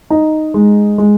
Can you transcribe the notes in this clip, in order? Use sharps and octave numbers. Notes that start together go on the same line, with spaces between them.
D#4
G#3
G#3